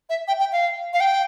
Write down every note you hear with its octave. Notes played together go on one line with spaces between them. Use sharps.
E5
G5
G5
F5
F5
G5